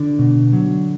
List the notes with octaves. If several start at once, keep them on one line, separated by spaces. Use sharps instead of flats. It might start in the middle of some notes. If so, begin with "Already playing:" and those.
Already playing: D3 D4
B2
F#3